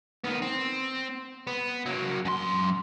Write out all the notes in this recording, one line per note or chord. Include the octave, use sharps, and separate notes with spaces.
D#3 B3
C4
B3
F#3 A#3
F#2 C6